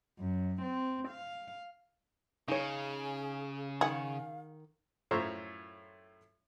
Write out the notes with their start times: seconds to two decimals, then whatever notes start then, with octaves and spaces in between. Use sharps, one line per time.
0.18 F#2
0.61 C4
1.08 F5
2.48 C#3 D#4 G#4 C#5
3.81 D#3 G#4 F5 F#5 B5
5.11 F#2 A2 F4 C5 C#5 A#5